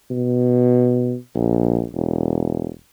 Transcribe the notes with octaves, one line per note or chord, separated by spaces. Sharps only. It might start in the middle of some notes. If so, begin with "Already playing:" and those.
B2
A#1
E1